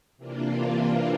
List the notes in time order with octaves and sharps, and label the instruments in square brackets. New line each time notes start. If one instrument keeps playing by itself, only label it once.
[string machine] C3 E3 A#3 D4 F4